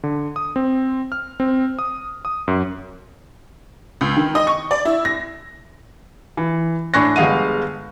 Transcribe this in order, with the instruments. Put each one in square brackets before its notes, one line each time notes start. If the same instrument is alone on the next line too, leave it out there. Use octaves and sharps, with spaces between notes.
[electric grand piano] D3
D#6
C4
F6
C4
D#6
D#6
F#2
[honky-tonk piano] C#2
D#3
D#5
C#6
D5
E4
A#6
[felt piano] E3
A2 D4 G#5 C#6 F#6 A#6
G1 G#3 G#4 F5 F#5 D#7